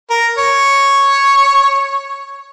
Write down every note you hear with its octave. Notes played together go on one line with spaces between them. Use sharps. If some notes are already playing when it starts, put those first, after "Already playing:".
A#4
C#5